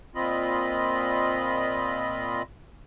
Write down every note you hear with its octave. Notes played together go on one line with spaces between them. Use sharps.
A#2 C4 F4 D#5 B5